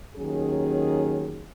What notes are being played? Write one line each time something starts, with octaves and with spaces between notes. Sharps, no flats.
D#2 D#3 F#3 C#4 G#4